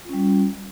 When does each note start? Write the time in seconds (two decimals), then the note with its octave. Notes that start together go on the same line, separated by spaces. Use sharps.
0.05 F4
0.09 C#4
0.13 G3